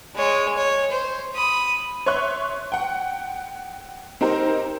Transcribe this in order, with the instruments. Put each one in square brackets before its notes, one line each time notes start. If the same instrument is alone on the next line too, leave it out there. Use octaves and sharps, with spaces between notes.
[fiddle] G#3 C#5
C#5
C5
B5 D#6
[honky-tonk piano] C#5 E5 C6 C#6 F#6
F#5 G5
C4 D#4 G4 A#4 C5